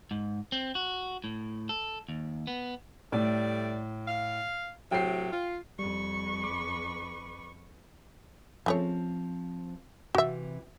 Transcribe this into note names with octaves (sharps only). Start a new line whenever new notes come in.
G#2
C4
F#4
A2
A4
D#2
B3
A2 G3 A3 D5
F5
A2 C3 F#3 G5 C7
F4
F2 G3 B4 C#6
B5 D6
C#3 F3 A3 C4 C#5
C3 E3 F#4 E5